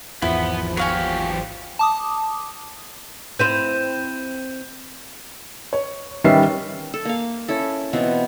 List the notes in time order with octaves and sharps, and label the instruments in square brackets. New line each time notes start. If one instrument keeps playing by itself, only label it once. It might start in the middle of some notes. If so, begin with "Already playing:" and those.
[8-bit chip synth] G#1 E2 F3 [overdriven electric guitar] B3 [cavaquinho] E4
[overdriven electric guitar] F#3 G4 [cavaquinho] C#5 F5 G#5
[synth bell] A5 D6 D#6
[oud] C4 E4 C5 [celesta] G6 D#7 E7
[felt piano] C#5
D#3 G3 C#4 B4 E5 C7
[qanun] A4
A#3 F5
C#4 E4 A4
B2 E3 C4 F4